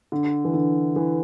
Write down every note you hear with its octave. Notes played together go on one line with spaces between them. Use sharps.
D3
E3
D3
E3